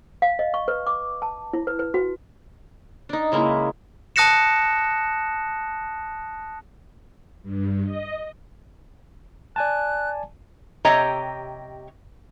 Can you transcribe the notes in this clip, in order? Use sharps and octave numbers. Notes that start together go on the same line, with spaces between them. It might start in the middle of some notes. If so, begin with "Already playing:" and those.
F5
D#5
C#6
B4
D6
A5
E4
B4
B4
F#4
D4 D#4
C#3 G#3 A#3 E4
A5 D#6 F#6 A#6 C#7 E7
G2
D#5
D5 G#5 A5 F#6
C3 G4 C#5 D#5 G5 A#5